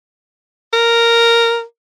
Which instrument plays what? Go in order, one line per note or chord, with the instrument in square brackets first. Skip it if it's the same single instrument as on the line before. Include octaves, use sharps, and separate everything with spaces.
[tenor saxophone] A#4